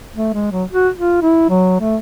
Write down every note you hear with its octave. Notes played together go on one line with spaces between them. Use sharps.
A3
G#3
F#3
F#4
F4
E4
F#3
A3